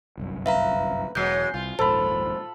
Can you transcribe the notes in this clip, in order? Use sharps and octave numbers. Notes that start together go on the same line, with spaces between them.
G1 C2 F#2
B4 E5 F5 A#5
E1 F#3 G#3 G6 C7
C2 F4
D#1 A#1 G#2 A4 C5 B5